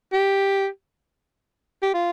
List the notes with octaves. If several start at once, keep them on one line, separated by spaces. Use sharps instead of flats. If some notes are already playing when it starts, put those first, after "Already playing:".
G4
G4
F4